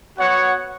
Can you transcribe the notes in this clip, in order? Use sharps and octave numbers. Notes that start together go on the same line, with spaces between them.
B3 F#4 C#5 F#5